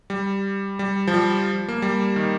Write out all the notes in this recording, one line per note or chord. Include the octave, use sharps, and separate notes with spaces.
G3
G3
F3
G3
A#3
G3
D#3